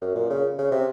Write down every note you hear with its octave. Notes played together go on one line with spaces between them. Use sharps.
F#2
A#2
C#3
C#3
C3